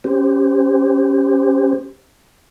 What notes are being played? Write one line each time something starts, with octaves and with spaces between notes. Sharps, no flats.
C#4 G4 C5